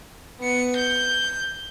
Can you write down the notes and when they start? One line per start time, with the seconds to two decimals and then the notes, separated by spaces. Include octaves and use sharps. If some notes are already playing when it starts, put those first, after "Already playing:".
0.41 B3 C#7
0.77 G6